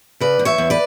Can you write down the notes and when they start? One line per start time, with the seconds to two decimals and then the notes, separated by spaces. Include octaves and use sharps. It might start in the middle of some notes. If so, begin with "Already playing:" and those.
0.20 C#3 B4 D5
0.39 E2
0.45 C#5 E5
0.58 E2
0.70 B4 D5